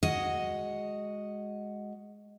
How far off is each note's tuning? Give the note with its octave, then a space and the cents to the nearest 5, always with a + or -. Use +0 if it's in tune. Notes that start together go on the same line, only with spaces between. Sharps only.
G#3 +0 F#4 +0 D#5 +0